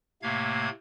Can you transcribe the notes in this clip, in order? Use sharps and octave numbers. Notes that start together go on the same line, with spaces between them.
A2 C3 A3 A#3 F5 G#6